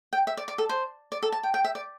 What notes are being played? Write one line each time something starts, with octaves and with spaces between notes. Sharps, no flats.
G5
E5
D5
D5
A4
C5
D5
A4
A5
G5
G5
E5
D5